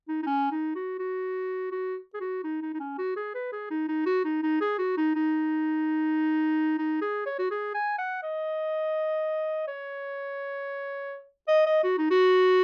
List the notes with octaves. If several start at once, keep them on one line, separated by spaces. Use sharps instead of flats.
D#4
D#4
C#4
D#4
F#4
F#4
F#4
G#4
F#4
D#4
D#4
D#4
C#4
F#4
G#4
B4
G#4
D#4
D#4
F#4
D#4
D#4
G#4
F#4
D#4
D#4
D#4
G#4
C#5
F#4
G#4
G#5
F#5
D#5
C#5
D#5
D#5
F#4
D#4
F#4